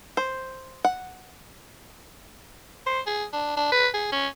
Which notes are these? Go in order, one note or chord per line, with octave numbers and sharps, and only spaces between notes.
C5
F#5
C5
G#4
D4
D4
B4
G#4
C#4